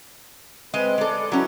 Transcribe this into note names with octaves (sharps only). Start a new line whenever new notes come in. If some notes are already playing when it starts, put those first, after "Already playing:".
G#3 C4 B4 D#5
G#3 A4 D5
F#3 C#4 D#4 E4 F#4